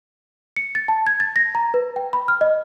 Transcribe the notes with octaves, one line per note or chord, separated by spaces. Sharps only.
C#7
A6
A5
G#6
A6
A#6
A#5
B4
G5
B5
F6
D#5